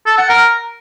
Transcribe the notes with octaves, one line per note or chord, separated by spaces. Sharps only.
A4
F#5
A#4